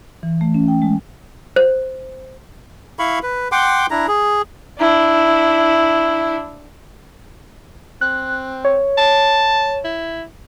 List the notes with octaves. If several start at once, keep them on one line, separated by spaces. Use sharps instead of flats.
E3
A3
C#4
G5
G#3
C5
E4 F5 B5 C#6
B4
F#5 G5 C6 D6
D4 E4 A#5
G#4
D4 E4
C4 F#6
C#5
A5
E4